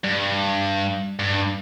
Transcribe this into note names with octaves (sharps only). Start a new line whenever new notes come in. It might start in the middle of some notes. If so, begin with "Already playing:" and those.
G2
G2